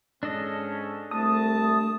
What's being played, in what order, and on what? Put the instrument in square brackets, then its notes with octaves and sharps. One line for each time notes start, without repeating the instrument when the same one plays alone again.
[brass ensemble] G#2 C#4 [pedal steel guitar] D4 A4 D#5
[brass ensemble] C2 A5 [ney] A3 [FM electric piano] D#6